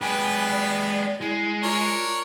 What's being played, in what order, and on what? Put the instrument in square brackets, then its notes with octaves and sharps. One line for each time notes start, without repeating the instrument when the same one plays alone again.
[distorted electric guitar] G#3 G4 [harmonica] B3 B4 [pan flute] G#5
[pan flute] D5
[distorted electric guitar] G#3 [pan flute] E4
[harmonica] D4 A#4 C#5 [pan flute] F4